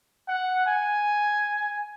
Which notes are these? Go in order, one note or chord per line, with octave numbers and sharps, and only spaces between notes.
F#5
G#5